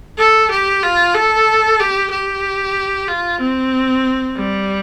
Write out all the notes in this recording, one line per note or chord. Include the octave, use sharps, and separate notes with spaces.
A4
G4
F4
A4
G4
G4
F4
C4
G3